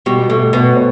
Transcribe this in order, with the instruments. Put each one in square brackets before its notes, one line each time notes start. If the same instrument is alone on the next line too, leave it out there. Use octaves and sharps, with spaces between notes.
[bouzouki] B2 [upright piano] G3 G4
[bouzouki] B2 [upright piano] A3 A4
[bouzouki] B2 [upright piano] B3 B4
[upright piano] C5